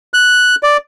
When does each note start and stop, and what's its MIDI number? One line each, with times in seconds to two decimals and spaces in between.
0.14 0.55 90
0.63 0.77 74